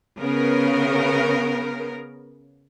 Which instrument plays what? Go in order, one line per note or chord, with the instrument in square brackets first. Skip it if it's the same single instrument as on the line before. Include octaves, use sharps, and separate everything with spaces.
[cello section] C#3 B3 A#4